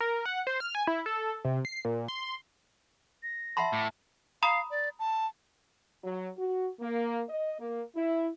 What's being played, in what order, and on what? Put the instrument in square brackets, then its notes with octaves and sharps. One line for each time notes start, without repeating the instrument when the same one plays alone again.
[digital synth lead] A#4
F#5
C5
F6
G#5
E4
A4
C3
C7
A#2
C6
[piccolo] A#6
[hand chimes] E5 A5 [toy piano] F#5 B5 C6
[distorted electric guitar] A2 [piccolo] D6
[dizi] F5 [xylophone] A#5 B5 D#6
[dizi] D5
A5
[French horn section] F#3
F#4
A#3
D#5
A#3
E4